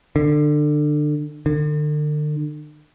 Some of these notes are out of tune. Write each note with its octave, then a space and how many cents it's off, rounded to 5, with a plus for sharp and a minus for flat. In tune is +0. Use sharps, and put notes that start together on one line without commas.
D3 +25
D3 +40